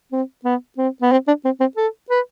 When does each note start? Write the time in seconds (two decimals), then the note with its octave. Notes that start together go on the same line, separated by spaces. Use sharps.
0.12 C4
0.45 B3
0.78 C4
1.02 B3
1.12 C4
1.27 D4
1.45 C4
1.60 C4
1.77 A4
2.10 B4